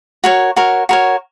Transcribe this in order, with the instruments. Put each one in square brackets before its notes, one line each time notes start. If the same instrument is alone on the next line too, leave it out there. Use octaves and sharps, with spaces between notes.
[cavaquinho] F#4 A#4 C#5
F#4 A#4 C#5
F#4 A#4 C#5